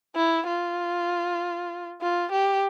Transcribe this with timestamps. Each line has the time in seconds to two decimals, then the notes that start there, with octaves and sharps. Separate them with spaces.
0.16 E4
0.47 F4
2.01 F4
2.32 G4